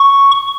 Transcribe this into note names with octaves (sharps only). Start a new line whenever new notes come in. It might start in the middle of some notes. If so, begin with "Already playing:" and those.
Already playing: C#6